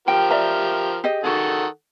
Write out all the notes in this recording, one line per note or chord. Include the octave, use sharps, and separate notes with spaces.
F3 G4 A#4 G5
D5 E5 A#5
G4 G#4 D#5
D#3 F#4 G#4 A4 F#5